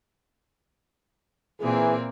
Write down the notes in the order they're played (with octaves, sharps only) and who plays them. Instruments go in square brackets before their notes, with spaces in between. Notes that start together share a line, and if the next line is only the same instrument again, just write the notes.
[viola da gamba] A#2 A#3 C4 [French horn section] E3 G#4